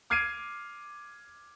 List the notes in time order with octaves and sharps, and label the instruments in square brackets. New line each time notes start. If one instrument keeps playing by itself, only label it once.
[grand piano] D6 F6 G#6 C7 D7 D#7